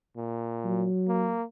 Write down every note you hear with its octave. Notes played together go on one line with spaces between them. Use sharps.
A#2
F#3
A#3